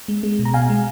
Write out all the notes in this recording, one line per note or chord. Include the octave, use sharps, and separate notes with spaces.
G#3
G#3
B2
A#5
B2 F5 G#5
G#3